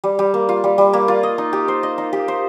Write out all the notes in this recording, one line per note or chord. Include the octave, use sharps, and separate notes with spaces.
G3
G3
A#3
F4
G3
G3
A#3
F4
D#5
D#4
G4
C5
D#5
D#4
G4
C5